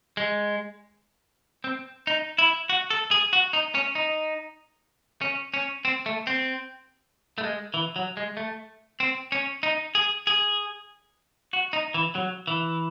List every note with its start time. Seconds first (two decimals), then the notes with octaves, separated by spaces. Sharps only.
0.17 G#3
1.64 C4
2.07 D#4
2.38 E4
2.70 F#4
2.90 A4
3.11 G#4
3.33 F#4
3.53 D#4
3.75 C#4
3.95 D#4
5.21 C#4
5.54 C#4
5.85 C4
6.06 A3
6.27 C4
7.38 A3
7.43 G#3
7.74 E3
7.96 F#3
8.17 G#3
8.37 A3
9.00 C4
9.32 C#4
9.63 D#4
9.95 G#4
10.27 G#4
11.53 F#4
11.73 D#4
11.94 E3
12.15 F#3
12.47 E3